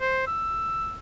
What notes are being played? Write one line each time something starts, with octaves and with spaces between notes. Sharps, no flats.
C5
E6